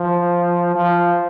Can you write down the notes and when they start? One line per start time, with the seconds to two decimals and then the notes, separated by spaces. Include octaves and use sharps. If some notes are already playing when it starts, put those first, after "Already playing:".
Already playing: F3
0.75 F3